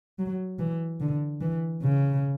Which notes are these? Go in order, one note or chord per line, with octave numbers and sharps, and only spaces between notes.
F#3
E3
D3
E3
C#3